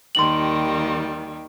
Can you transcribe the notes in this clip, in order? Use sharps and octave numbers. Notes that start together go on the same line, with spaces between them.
D#2 D#3 G3 C6 F#7